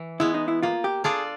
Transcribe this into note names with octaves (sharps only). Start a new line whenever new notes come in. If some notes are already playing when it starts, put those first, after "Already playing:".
Already playing: E3
G#3 B3 E4
D#4
E4
A#3 F4
G4
D4 F4 G#4 A4 D5